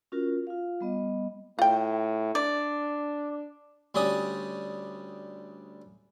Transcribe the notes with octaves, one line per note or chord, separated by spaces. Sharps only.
C#4 F4 F#4 A#4
F4 F5
G3 B3 D#5
A2 F4 G5
D4 D5
D2 G3 C#4 G4 D5 D#6